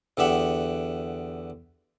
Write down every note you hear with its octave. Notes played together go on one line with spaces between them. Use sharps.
E2 D3 G4 E5 F#5